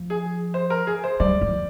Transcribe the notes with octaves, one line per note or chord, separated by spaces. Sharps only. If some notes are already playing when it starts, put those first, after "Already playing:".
Already playing: F3
G#4
C5
A#4
G#4
C5
G3 D5
F3